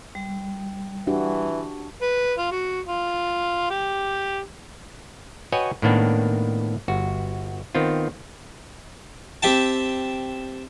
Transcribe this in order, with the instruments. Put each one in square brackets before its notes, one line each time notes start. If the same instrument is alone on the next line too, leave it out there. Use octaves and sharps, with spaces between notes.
[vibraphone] G3
[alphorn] E3 [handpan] D4 F#4 G4
[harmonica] B4
F4
F#4
F4
G4
[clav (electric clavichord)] F#4 B4 C#5 D#5 G5 G#5
A2 D#3 A#3 B3 D4
G1 F#4
D#3 B3 C4 F4
[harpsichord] C4 G4 E5 G5 A5